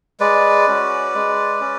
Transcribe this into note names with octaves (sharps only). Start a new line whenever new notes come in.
G#3 B4 D5
C#4 F#4
G#3
C#4